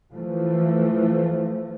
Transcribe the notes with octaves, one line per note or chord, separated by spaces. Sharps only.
E3 F3 A3